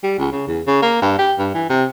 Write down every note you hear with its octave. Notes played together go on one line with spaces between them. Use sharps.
G3
C#2
C#3
E2
C#3
A#3
G2
G4
G2
E3
C3